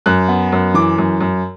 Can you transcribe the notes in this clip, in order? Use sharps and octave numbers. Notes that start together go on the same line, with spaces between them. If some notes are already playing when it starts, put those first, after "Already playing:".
F#2 F#6
B3
F#2
E3 D6
F#2
F#2